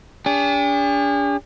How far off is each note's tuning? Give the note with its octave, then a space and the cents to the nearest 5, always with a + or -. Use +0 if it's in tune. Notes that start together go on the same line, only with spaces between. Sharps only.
D4 -40 G#4 -45